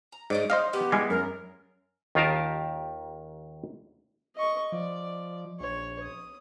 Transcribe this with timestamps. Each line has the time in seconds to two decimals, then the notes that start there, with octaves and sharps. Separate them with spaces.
0.12 A#5
0.30 G#2 C#4 D#4 D5
0.50 D#4 C5 D#5 F5
0.73 B3 G4
0.92 G3 G#3 E4 G#5
1.10 F#2 A#4
2.15 D#2 D#3 F4 G4 A#4 A5
4.36 D#5 C#6
4.72 F3 D5
5.60 A#1 C#5
6.02 D#6